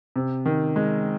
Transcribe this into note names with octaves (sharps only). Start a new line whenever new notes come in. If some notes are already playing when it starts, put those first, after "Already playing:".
C3
D#3
G#3